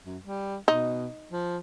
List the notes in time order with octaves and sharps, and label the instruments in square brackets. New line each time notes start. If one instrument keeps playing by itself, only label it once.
[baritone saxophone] F#2
G3
[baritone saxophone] B2 [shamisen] D#4
[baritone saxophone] F3